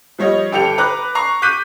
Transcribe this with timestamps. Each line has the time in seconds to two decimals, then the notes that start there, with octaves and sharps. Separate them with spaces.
0.19 F3 G3 C#5 D#5
0.52 G1 G4 A4 G5 C#7 F7
0.78 B4 A#5 D6 F#6
1.15 A#5 C#6 C7
1.42 D6 F#6 G6 B6 D#7